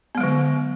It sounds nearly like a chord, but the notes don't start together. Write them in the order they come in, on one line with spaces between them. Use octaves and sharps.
B3 G#3 F#3 D3